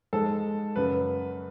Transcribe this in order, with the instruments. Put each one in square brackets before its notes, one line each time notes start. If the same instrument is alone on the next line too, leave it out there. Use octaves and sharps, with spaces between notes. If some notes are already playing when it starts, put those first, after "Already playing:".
[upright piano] G#2 G#3 A4
F#2 C#3 F#3 B4